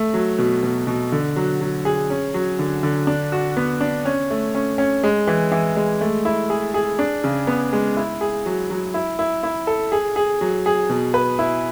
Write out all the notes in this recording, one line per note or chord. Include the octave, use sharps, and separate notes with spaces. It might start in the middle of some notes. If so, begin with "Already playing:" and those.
Already playing: A3
F#3
B2
B2
B2
D3
F#3
F#3
G#4
C#4
F#3
D3
D3
D4
F#4
B3
D4
C#4
A3
C#4
C#4
G#3
E3
E3
G#3
A3
E4
G#4
G#4
D4
C#3
B3
G#3
E4
G#4
F#3
F#3
E4
E4
E4
A4
G#4
G#4
F#3
G#4
B2
B4
E4